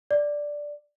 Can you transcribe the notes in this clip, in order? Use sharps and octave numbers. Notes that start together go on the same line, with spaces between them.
D5